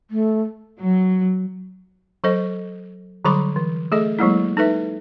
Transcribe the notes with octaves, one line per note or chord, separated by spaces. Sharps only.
A3
F#3
F#3 A4 C5 D#5
D3 F#3 G3 B5 C6 D6
E3
A3 G#4 A4 D#5
F#3 G#3 A#3 E4
D#4 A4 B4 E5